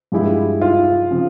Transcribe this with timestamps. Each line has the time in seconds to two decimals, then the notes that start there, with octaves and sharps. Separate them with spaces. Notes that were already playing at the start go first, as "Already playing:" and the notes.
0.12 G2 F3 G#3 E4 G4
0.61 F4
1.11 C#3 F3 C4